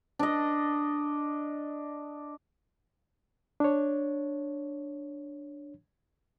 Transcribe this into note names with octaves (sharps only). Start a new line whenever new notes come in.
D4 D#5
D4 C#5